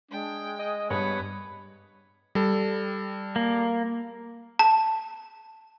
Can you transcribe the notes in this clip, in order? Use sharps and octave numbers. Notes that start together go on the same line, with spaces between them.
G#3 D4 G5
D#5
G2 B3 C#5
G3 A4
A#3
A5